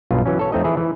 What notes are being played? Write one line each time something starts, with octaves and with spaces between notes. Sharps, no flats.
B1 G2 B2 F4
E3 F#3 C#4
A4 C#5
F2 A3 C4 D#4 D#5
E3 E4 G#4
E3